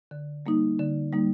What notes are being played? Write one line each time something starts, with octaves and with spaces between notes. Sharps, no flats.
D3
G3 A#3 D#4
D3
G3 A#3 D#4